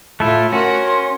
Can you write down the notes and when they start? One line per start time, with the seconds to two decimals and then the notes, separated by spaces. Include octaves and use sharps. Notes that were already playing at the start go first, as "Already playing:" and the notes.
0.20 A2 A3 E4 F4
0.53 C#4 F#4 A#4 C6